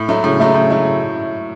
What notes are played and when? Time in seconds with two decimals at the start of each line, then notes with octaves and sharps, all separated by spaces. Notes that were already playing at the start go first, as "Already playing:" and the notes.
Already playing: A2
0.08 F#3 A3 E4
0.24 A2 C#3
0.40 F#3 A3 E4
0.55 A2
0.70 F#3 A3 E4